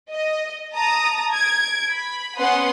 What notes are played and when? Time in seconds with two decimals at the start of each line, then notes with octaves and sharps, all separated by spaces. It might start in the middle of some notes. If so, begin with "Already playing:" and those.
0.11 D#5
0.75 A5 A#5 D#6
1.33 G#6 D7
1.91 B5
2.38 B3 C#4 B4 F#5 C6 D#6